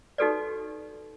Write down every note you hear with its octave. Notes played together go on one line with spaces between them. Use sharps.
D#4 F#4 G4 A4 B4 D5